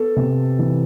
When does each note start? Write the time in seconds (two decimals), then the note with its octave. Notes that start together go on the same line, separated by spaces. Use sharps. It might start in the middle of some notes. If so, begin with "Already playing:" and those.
Already playing: B3 A4
0.16 C3
0.59 E3